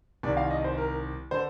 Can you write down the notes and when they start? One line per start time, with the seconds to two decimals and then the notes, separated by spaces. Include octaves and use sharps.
0.23 C2 C3 D#3 D5
0.37 F5
0.51 D#5
0.64 C5
0.78 A#4
1.31 D3 C5